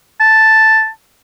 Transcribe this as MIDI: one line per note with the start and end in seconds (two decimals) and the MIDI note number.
0.21 0.88 81